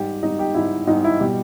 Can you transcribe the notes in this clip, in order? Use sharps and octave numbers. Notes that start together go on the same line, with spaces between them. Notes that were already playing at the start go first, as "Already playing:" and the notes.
Already playing: G#2 G3 G4
G#2 G3 D#4
G4
G#2 G3 E4
G#2 G3 D#4
E4
B2 G3 G4